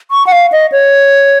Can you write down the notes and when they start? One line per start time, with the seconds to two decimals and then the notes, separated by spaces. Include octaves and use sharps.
0.11 C#6
0.27 F#5
0.32 F5
0.52 D#5
0.72 C#5